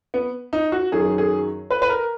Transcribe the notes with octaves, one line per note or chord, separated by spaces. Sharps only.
B3
D#4
F#4
F#2 D#3 F#3 G#4
G#4
B4
B4
A#4